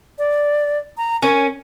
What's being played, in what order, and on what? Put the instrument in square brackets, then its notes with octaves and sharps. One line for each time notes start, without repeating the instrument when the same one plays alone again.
[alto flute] D5
A#5
[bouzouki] C#4 [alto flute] A#4